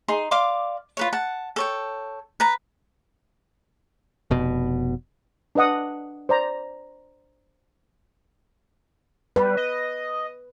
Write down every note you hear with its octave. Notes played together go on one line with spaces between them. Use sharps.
D#4 G#4 C6
D5 F5 C6 D6
F4 B4 C#5
F#5 A5
A4 C#5 G5
B4 A#5
F1 B2
D4 B4 D#5 F#5 D#6
C5 D5 A#5
G3 B4
D#5